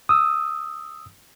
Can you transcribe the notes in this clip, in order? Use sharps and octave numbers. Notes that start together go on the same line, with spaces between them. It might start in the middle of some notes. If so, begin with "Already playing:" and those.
D#6 E6